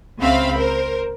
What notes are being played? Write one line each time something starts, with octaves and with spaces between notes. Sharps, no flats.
C#2 C#3 C4 E5 F5 B5
A#4 C5